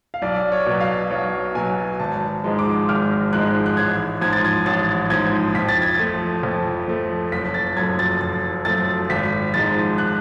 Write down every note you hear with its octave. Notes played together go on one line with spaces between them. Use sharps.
F5
B1 D5
C#5
B2 F#3
F5
B1 C#5
B2 F#3 G#5
G#1 A5
G#2 F3 G#3
D6
G#1 F6
G#2 F3 G#3 F#6
F#6
A1 G#6
G#2 F3 G#6
A6
G#6
A1 A6
G#2 F3 G#6
F2 B6
A6
G#6
F3 A3 A6
F2
F3 A3
F#1 B6
A6
F#2 F3 A3 G#6
A6
F#1 A6
F#2 F3 A3 A6
G#1 B6
G#2 F3 G#3 A6
F#6